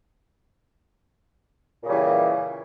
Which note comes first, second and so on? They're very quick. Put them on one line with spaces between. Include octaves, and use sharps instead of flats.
A#2 C#3 G3 E3